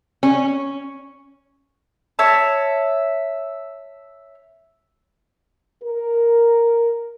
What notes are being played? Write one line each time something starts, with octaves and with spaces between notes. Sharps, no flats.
C#4
C#5 E5 A5
A#4